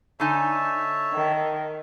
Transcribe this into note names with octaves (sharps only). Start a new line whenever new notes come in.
D3 D#4 C#5 E5 G#5 A5
D#3